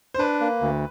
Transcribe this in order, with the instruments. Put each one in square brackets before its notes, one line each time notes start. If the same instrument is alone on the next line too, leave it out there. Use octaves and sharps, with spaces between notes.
[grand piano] C5
[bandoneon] D4 [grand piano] B4
[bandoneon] A#3
D2